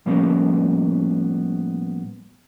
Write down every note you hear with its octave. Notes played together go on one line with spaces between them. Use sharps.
A2 F3 G3 A#3 B3 C#4